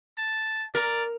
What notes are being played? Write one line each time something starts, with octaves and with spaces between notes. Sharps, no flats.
A5
A#4 D5